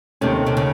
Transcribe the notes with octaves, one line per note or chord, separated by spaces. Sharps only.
D#2 C3 D#3 A3 C#4
C3
C#3